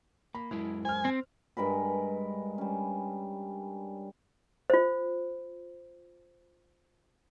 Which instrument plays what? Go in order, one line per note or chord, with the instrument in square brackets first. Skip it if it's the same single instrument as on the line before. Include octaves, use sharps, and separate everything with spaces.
[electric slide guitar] A#3 [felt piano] B5
[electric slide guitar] F#2 G#3 A#4 [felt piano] E4
[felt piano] C5 F6 [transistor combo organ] G#5
[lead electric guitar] C4
[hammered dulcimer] G2 G#3 A#4 B5
G3 C#4
[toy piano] F4 C5